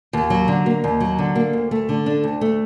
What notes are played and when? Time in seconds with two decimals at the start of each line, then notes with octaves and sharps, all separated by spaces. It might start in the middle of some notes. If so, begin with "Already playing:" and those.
0.13 D#2
0.30 F#3
0.48 D3
0.66 A#3
0.84 D#2
1.00 F#3
1.19 D3
1.35 A#3
1.53 D2
1.71 A3
1.89 D3
2.06 D4
2.24 D2
2.41 A3